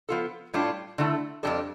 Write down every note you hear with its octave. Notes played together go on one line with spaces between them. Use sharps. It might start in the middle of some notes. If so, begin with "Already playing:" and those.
F3 B3 F4 A4
A2 G3 D4 F4
D3 A3 E4 A4
F2 E3 G3 D4 A4